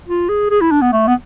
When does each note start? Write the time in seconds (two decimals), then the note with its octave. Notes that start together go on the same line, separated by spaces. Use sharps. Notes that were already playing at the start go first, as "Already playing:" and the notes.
0.08 F4
0.29 G#4
0.50 G#4
0.61 E4
0.72 D4
0.82 B3
0.93 A3
1.08 B3